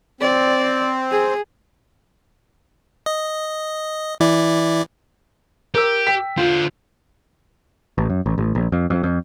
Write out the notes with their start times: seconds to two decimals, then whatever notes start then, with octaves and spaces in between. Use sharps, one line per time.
0.21 C4 D5
1.11 G#4
3.06 D#5
4.20 E3 E4 D5
5.74 G4 A#4 E6
6.07 G5 B6
6.37 D3 F4 C5
7.98 A1
8.10 F#2
8.26 A1
8.38 A1
8.55 A#1
8.72 F2
8.90 F2
9.03 F2